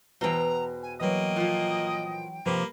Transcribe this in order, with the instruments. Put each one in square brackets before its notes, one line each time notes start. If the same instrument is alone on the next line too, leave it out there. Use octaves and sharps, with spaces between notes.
[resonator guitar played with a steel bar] E2 B2 [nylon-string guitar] B4 C5 G5 [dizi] A#5
[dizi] G#5
[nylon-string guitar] E3 F#3 [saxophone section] A#3 D#5 [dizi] G5
[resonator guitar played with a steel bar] A#2 F3
[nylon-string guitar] C3 F3 [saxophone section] A#3 G4 B4